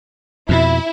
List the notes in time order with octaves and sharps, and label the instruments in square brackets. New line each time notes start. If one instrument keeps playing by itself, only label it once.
[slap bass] F2 B2 [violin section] E4